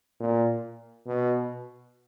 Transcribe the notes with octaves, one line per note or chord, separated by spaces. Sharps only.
A#2
B2